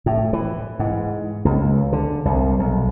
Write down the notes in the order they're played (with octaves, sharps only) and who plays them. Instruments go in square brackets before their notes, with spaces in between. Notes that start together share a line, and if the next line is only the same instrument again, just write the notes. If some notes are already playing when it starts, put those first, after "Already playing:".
[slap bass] A2
E3
G#2
C#2
D3
C2
B1